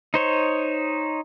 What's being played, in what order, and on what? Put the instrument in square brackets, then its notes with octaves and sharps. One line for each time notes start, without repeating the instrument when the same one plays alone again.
[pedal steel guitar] D#4 C5 C#5